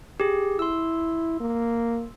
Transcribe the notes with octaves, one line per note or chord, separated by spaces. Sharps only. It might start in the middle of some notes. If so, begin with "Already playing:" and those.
G4 G#4
E4 C6 E6
A#3